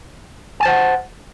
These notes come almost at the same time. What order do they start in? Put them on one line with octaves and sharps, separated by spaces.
G#5 A5 C5 F#5